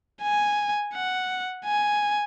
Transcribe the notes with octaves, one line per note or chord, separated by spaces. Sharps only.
G#5
F#5
G#5